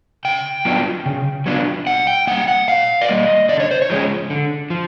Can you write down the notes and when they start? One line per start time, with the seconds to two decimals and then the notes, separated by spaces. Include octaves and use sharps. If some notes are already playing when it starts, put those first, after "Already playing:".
0.25 C#3 G5
0.65 F#3 B3 D4 F4
1.06 C#3
1.46 F#3 B3 D4 F4
1.87 A#2 F#5
2.07 G5
2.27 G3 A#3 F#5
2.48 F#5
2.68 A#2 F5
3.01 D5
3.08 G3 A#3 D#5
3.49 D3 D5
3.60 C#5
3.71 C5
3.82 C#5
3.90 F3 G#3 C#4
4.30 D3
4.70 F3